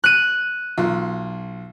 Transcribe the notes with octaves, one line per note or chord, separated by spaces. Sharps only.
F#6 D#7
B1 F4